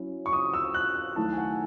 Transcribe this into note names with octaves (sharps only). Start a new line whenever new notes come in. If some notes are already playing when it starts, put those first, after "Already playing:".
Already playing: F#3 C#4 E4
C#6
D#6
E6
F#6
D#3 F#3 A3 E4 A5
G#5
F#5